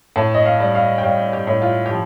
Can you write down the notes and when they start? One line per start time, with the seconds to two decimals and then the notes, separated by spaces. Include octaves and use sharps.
0.16 A2 A5
0.34 D#5
0.46 F5
0.60 G3
0.75 F5
0.98 G5
1.03 G3 F5
1.33 G4
1.47 A2
1.62 F4
1.86 G4
1.90 F3